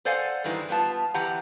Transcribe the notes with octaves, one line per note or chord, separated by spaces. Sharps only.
A4 C5 D5 F5 F#5 G#5
G2 D#3 E3 G3 G#3
G3 B3 F4 A5
E2 E3 E4 G4 F#5 A#5